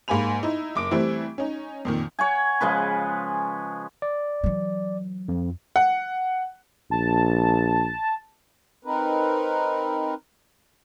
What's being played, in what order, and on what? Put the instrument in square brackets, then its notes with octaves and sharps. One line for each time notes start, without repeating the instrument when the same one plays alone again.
[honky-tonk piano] G#2 A#3 G#5 B5 F7
D#4 E4
F#1 D6 D7
E3 G3 A3 C4 E4
C#4 D#4
F2 A#2 D#3
[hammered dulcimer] C#5 F#5 G#5
C#3 F3 G#3 B4
[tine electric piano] D5
[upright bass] E3 F#3
[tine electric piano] F2
[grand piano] F#5
[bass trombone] A#1 [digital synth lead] A5
[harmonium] C4 D#4 A#4 B4